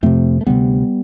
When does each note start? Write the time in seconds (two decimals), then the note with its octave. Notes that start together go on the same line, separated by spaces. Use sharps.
0.03 F2 C3 A3 C4
0.41 A3
0.46 D2 C3 G3 B3